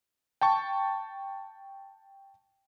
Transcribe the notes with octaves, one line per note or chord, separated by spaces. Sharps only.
G5 A5 C#6